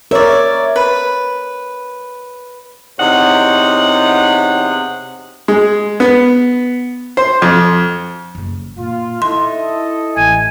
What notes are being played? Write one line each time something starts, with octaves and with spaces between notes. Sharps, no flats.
A#4 C#5 D5 E5
B4 B5
E2 C3 D#4 C#5 F#5
G#3
B3
C5
F2
F#1 C#3
A#2 F4
D#4 E4 A4 D#5 C6
A1 G#5